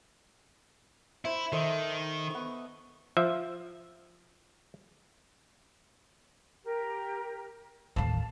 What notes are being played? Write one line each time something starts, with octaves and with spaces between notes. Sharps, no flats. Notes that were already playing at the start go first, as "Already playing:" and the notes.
E4 C5 E5
D#3 A4 C5 D#5
B3 C#6
F3 E5
G4 A#4
A1 D#2 F5 A5